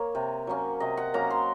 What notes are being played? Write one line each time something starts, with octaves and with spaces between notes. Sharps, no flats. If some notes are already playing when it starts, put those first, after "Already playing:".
Already playing: A#3 A#4 C#5
C3
F#3 A#3 C#4
C3 D#5
F#5
F#3 A#3 C#4 A#5
C6